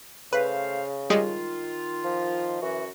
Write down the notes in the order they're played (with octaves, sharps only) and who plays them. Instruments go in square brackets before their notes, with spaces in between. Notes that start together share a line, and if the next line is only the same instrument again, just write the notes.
[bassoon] C#3 [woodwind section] A3 C5 F5 [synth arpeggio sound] B4
[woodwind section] D#3 F4 [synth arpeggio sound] G3 G#3 D#5
[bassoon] F3
[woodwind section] F#2 F#4 [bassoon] E3